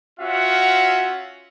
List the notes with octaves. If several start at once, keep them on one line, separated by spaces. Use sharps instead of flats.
C#4 F4 F#4 E5 F#5